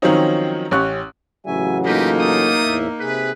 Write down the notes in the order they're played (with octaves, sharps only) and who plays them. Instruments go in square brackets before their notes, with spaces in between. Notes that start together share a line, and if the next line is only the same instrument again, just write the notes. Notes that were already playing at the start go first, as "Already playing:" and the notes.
[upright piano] D#3 F3 F#3 C4 C#4 D#4
A1 C#4 G4 C#6 F#6
[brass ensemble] A1 C#3 F#3 [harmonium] E5 G#5
[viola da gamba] A#3 D#4 [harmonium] F4 A4 [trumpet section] G4 B4 D#5
[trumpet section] A3 D#6
[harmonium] E2 A2 E5
[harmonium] C3 G#4 [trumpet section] B4